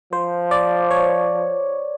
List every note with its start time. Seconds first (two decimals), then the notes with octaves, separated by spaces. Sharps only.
0.12 F3 C5
0.51 D5
0.91 C#5